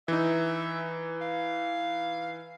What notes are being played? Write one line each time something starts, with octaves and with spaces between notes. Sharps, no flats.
E3 D#4 E5
F5